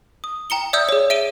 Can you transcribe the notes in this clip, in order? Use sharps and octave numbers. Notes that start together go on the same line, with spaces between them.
D#6
G5 A#5 C#7 G7
D5 E5 D#6 E6 G6
G#4 C#5
E5 D7 D#7 G7